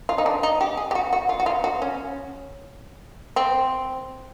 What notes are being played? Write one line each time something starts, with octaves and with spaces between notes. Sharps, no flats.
F4
D#4
D4
D#4
G4
G#4
G4
F#4
F#4
F4
F#4
F4
F#4
C#4
C4